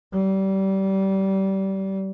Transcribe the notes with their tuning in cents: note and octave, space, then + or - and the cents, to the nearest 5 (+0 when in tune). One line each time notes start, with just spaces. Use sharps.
G3 -25